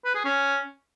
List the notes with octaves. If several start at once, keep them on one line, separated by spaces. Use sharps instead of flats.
B4
G#4
C#4